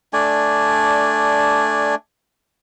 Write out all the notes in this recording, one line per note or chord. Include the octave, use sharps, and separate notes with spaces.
A3 D4 D5 G#5